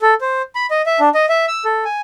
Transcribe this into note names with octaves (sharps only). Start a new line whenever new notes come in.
A4
C5
B5
D#5
E5
D4
D#5
E5
E6
A4
G#5